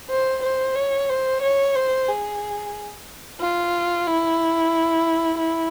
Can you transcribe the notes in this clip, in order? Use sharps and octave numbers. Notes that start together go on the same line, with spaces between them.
C5
C5
C#5
C5
C#5
C5
G#4
F4
E4
E4